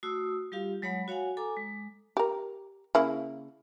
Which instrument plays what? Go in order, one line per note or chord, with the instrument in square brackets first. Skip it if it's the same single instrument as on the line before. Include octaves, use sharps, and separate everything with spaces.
[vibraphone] A3 F#4 D#6 E6
G3 F4 G4 F5
F#3 G#3 C#5 F#5 B5
F#4 C#5 F5 F#5 G#5
A4 G#5 A#5 D6
G#3
[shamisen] G4 A#4
C#3 A#3 E4